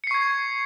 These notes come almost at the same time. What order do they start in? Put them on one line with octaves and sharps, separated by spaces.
C#7 C7 C#6 G#6